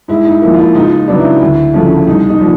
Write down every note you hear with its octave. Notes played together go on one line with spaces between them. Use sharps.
G#2 E4
D#4
F3 A#3 E4
F4
E4
C#2 D#4 F4
C#3 F#3 B3 D4
E4
D2
C#3 F3 A3 C#4
C2 D#4
D#4
A#2 F3